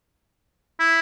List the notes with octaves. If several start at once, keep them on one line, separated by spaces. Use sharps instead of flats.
E4